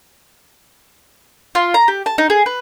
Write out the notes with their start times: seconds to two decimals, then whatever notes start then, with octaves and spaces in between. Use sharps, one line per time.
1.55 F4
1.74 A#5
1.88 G4
2.06 A5
2.18 D#4
2.30 G#4
2.46 B4